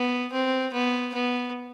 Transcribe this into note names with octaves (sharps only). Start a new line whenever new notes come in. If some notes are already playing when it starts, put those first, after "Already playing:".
Already playing: B3
C4
B3
B3